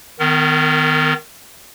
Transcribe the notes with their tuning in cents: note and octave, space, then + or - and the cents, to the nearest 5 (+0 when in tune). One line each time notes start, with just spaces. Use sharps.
D#3 +0 B3 +40 A#4 -35